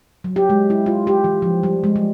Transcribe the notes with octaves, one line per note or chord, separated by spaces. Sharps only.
F#3
G4
G#3
E4
F4
G4
E3
F3
G3
G#3
G3